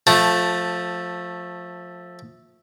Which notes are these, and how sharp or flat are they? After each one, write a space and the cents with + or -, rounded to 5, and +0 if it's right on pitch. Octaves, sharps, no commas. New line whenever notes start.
F3 +20 A3 +0